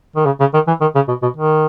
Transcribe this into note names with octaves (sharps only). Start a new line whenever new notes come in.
D#3
C#3
C#3
D#3
E3
D#3
C#3
B2
B2
D#3